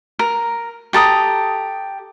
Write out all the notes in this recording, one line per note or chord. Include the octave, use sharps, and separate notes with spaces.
A#4
G4 A4 A#5 D#6